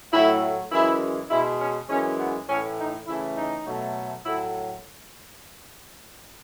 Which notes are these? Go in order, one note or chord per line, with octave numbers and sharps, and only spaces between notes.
A2 F#3 A3 E4
F#2 E3 G#3 E4
B2 G#3 E4
C#4
F#2 E3 G#3 C#4
B3
A2 E3 A3 C#4
D#4
C#3 E3 A3 E4
D#4
B2 F#3 A3
A2 F#3 A3 E4